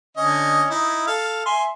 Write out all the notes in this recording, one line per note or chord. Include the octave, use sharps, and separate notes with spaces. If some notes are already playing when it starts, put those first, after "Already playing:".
D3 C#4 D#5
D#4 E4
A4 F5
E5 G#5 C6